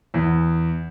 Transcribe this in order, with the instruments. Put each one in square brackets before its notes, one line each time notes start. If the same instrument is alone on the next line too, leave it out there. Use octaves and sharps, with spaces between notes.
[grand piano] E2